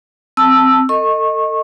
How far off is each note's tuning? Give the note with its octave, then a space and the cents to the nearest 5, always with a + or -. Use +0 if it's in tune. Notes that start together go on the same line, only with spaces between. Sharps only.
C4 +0 A5 +0 E6 +5
A4 +35 D#5 +0 C#6 -25